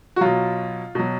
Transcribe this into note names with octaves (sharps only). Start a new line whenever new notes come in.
F#4
B2 F#3 F4
B2 F#3